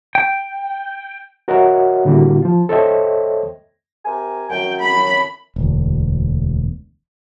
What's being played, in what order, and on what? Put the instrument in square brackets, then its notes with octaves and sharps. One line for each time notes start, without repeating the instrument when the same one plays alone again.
[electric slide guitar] G5
[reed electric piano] F#4 A#4 C#5 D#5 E5 F#5
A2 D3 G3 A#3 E4 F#4
F3 F4
A4 C5 C#5 D#5 E5 G5
[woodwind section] C3 A#4 G#5
[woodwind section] F#2 [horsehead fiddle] G5
[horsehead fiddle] B5
[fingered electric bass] E1 D2